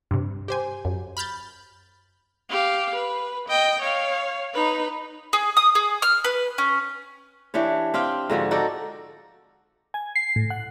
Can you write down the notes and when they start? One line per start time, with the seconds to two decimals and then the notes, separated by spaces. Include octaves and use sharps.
0.11 G2 C3
0.48 G4 C5 G#5
0.85 F#2
1.17 B5 F6 G6 A6
2.50 G4 F5
2.95 B4
3.48 D#5 G5
3.82 C#5 F5
4.53 D#4 B4
5.33 G#4
5.57 D#6
5.75 G#4
6.02 F6
6.24 B4
6.58 C#4
7.54 E3 D4 G4 C#5
7.94 C4 G4 F5 G5
8.29 G#2 D3 F3 F#4
8.51 D#4 F#4 A4 D5
9.94 G#5
10.16 C7
10.36 A2
10.50 F#5